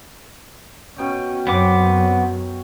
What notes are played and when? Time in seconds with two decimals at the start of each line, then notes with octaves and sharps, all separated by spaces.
0.98 B2 C#4 G5
1.47 F#2 F#3 B3 C4 C#5 D6